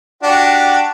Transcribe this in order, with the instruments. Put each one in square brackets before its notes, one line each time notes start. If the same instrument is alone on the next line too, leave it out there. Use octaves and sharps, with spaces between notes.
[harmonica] D4 F#4 G4